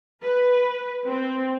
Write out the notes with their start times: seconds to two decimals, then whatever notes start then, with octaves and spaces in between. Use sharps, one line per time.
0.23 B4
1.07 C4